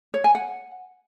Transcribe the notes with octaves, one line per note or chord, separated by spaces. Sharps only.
C#5
G#5
F#5